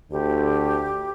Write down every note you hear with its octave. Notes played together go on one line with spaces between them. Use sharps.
D2 G4